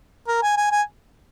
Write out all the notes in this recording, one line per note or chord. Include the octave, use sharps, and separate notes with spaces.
A#4
G#5
G#5
G#5